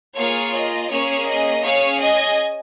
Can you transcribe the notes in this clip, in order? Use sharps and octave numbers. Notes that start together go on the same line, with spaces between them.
A#3 F4 G#4 C#5 F5
D#5
A#3 C#4 G#4 C#5
D#5
C#4 G#4 C#5 F5
D#5 G#5